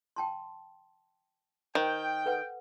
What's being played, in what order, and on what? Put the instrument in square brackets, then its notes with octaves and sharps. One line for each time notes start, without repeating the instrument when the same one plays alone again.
[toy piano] G5 A5 C6
[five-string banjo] D#3 [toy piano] C5 [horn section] G5
[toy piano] A4 B4 F#5